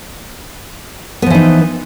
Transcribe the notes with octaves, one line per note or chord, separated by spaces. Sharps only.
E3 F3 B3 D#4